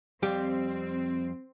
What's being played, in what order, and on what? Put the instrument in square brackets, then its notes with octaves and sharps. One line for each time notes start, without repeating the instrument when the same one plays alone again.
[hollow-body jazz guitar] F2 G3 G4 [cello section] C4